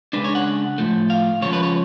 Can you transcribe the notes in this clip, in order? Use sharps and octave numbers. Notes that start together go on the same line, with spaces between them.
C#3 G#3 D4 B4
C#5
F#5
A2 F3 A3
F5
C#2 C#3 F3 C#5
B4
C#5